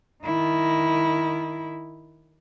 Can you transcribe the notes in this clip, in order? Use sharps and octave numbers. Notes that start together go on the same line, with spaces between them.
D#3 E4